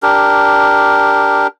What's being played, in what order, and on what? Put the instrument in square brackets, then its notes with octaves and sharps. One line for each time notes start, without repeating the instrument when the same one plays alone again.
[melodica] D4 G4 A#4